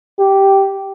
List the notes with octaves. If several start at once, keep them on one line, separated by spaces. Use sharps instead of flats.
G4